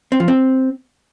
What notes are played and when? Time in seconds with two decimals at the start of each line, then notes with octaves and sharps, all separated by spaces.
0.12 C4
0.20 F3
0.28 C4